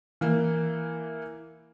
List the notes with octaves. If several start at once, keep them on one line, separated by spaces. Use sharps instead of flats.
E3 A#3